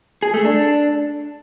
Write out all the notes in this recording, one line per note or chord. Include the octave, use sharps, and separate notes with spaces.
G#4
A3
D4